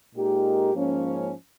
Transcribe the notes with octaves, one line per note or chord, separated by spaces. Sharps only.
A#2 G#3 D#4 G4 A#4
G#2 F3 A#3 C#4